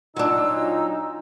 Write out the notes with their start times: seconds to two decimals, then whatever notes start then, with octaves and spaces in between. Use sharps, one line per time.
0.17 A#2 F#3 D4 D#4 F4 E6